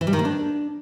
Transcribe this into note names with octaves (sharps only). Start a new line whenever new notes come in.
E3
G3
D#3
A#3
D4